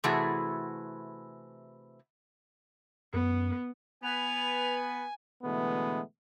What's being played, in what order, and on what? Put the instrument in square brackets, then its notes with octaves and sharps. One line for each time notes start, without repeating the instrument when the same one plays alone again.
[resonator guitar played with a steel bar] C3 E3 A3 E4 F#4 G#4
[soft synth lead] F#2 [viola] B3
[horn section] B3 B4 [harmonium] G#5 [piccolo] F7
[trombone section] B2 D3 E3 G#3 A3 B3